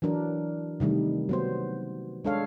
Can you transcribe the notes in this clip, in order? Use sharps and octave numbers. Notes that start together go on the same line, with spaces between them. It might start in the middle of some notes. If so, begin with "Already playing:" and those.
E3 F#3 D4 A#4
C3 D#3 G3 A3
F#3 B3 C5
G#3 D4 A4 C#5 F5